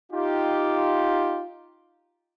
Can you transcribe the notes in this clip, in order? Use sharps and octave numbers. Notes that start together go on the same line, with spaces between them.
D#4 F4 G4